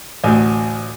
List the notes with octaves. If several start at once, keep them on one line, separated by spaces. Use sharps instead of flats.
A1 D2